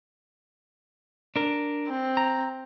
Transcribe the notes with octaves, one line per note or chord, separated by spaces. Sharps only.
D4 A#4
C4
A#5